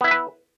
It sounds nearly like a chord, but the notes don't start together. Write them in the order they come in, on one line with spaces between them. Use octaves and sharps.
B3 E4 E5 B4